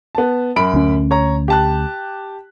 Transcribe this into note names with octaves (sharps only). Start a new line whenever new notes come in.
B3 A5
F#2 B5 D7
D2 C#4
C#5 A#5
G4 A5 F#6